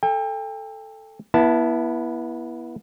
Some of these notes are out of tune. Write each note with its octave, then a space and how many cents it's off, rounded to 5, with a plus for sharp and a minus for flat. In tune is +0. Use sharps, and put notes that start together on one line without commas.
A4 +0 G5 +35
B3 -30 E4 +0 A5 +0